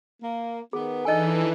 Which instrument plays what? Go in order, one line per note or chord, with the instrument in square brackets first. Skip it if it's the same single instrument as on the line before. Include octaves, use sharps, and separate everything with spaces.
[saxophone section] A#3
[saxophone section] D#3 B3 [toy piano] G#4
[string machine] E3 [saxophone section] D4 D#4 A4 [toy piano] D#5 G#5